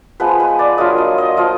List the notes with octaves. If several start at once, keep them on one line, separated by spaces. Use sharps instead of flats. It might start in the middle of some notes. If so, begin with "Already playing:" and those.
F3 G#3 B3 B4
B4
D5
F#3 A#3 D4 F4 D#5
D#5
D#5
F3 A#3 F4 D#5